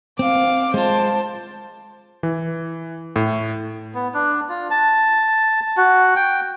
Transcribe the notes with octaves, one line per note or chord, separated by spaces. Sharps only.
C4 F5 D6
G#3 F4 C5 A5
E3
A2
B3
D4
F4
A5
F#4
G5